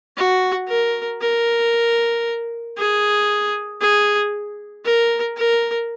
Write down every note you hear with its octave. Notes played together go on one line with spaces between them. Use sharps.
F#4
A#4
A#4
G#4
G#4
A#4
A#4